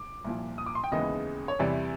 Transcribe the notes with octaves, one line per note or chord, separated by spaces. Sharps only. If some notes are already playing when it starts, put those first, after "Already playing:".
Already playing: D6
C2 A#2 F3
D#6
D6
C6
G5
D#2 C#3 E3 G#3 B3 D#5
C#5
E2 C3 E3 G3 D5